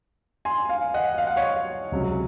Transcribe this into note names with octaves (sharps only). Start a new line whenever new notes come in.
G#5 C6
F5 G#5
D#5 F#5
F5
F#5
C#5 F5
C#2 C3 F#3 C#4